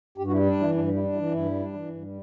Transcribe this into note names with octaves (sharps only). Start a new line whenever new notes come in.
G2 G4
F#4
G3 E4
D4
E3 E4
G2 D4
G3
E4
D4
E4
E3
G2 E4
G3
D4
E3
G2
G3